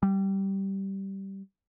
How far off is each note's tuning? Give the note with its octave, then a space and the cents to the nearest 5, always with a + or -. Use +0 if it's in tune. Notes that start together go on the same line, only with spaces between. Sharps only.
G3 -10